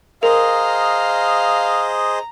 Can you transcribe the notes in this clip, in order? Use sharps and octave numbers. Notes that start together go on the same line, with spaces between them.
G#4 A#4 C5 D#5 F5 A#5